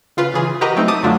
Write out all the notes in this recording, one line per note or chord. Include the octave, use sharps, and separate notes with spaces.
C#3 F4 B4
C#3 E3 G#4
F#4 G4 A#4 B4 D#5 A#5
F#3 A3 C4 D#4
A5 D6 D#6
F#2 D3 F#3 A3 D4 F4